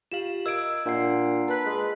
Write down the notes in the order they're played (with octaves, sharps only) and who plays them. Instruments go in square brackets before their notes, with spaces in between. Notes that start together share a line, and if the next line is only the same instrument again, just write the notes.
[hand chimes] F4 G4 F5 [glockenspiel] E7 F#7
[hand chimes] A#4 D#5 G#6 [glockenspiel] E6 D7
[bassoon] A#2 [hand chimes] D4 F#5 C7
[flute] B4 [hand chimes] A5 F#6
[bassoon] G#3